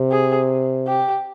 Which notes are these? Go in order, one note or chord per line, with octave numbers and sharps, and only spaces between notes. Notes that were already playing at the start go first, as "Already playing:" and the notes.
Already playing: C3
G#4
G4